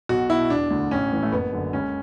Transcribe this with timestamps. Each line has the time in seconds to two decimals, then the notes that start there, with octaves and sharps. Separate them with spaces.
0.09 B1 F#4
0.29 B2 E4
0.50 E1 D4
0.71 D2 D3
0.91 A1 C#4
1.12 A2 E3
1.23 A3
1.33 F#1 B3
1.53 F#2 D3
1.73 C#2 C#4